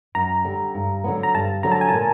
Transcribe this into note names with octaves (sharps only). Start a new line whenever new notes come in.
F#2 A#5
D3 G3
G2
D3 F#3 B3
A#5
G2 A5
D3 F#3 A#5
A5
G#5
A#2 A5